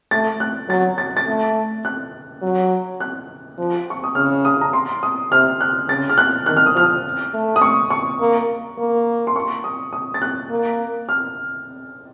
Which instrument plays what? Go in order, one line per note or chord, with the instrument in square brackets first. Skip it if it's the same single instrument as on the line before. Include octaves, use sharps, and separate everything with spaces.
[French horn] A3 [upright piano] A6
[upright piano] F#6
[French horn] F#3 [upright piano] A6
[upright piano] A6
A6
[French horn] A3
[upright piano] F#6
[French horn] F#3
[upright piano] F#6
[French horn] F3
[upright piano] C#6
D#6
[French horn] C#3 [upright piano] F6
[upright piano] D#6
A#5
C6
D#6
[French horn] C3 [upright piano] F6
[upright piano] F#6
[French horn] C#3 [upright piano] A6
[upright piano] F6
F#6
[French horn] D#3 [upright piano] F#6
[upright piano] F6
D#6
[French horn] F3 [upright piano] F6
[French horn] A3
[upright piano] D#6
C#6
C#6
[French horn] A#3
A#3
[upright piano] C6
C#6
D#6
D#6
A6
F#6
[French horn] A#3
[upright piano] F6